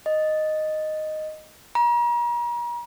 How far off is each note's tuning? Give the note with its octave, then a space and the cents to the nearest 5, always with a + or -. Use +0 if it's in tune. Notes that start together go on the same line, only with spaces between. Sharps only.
D#5 -5
A#5 +40